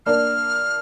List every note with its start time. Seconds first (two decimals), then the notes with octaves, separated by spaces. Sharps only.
0.06 A#3 D4 F6